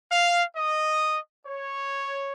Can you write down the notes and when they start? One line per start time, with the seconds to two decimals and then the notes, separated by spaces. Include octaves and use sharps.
0.10 F5
0.55 D#5
1.45 C#5